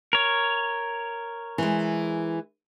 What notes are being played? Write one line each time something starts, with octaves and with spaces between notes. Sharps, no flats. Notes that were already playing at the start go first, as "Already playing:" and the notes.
A#4 C#5
E3 G#3